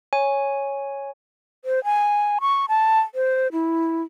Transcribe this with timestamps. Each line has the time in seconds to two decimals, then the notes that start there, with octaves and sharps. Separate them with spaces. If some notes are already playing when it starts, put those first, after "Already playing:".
0.13 C#5 G#5
1.65 C5
1.84 G#5
2.41 C#6
2.69 A5
3.15 C5
3.52 E4